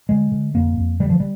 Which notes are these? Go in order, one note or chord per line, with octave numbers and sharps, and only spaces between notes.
D3 G#3
D3
F2 A#3
F2
D3 G3
F3
G3